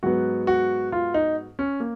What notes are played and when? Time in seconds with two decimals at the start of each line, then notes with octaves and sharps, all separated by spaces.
0.03 G#2 F#3 B3 F#4
0.47 F#4
0.92 F4
1.14 D#4
1.59 C#4
1.80 A#3